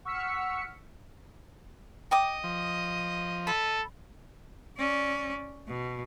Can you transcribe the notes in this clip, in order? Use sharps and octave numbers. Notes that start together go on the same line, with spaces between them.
F#5 C#6 E6 F6 B6 C#7
D#5 G5 D6 D#6
F3
A4 B5
C#4 D5
B2